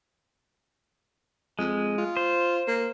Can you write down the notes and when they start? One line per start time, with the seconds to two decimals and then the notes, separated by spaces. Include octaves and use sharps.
1.59 F2 G#3
1.98 F4
2.17 C5
2.68 A#3